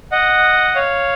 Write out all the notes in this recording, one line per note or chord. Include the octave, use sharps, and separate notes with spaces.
D#5 F#5
C#5 F5